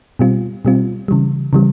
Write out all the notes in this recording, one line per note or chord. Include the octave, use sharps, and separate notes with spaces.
B2 G3 C4 F4
B2 G3 C4 F4
C#3 E3 G3
C#3 E3 G3